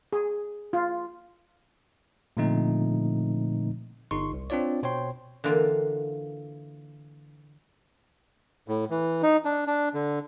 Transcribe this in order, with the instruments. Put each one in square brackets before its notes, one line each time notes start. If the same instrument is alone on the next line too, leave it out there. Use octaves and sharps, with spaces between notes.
[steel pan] G#4
F4
[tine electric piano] A#2 D3 F3 A3 C4 D#4
G1 D#4 C6 C#6
C2
C4 D4 F4 C#5 D5
B2 C5 C#5 G5 C6
[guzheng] D3 E3 A#3 F4
[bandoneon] A2
E3
D#4
D4
D4
D3